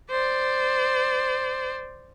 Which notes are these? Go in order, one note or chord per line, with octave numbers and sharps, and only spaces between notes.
C5 D5